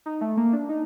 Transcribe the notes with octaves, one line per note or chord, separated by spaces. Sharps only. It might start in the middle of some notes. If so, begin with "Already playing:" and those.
D#4
A3
A#3
D4
D#4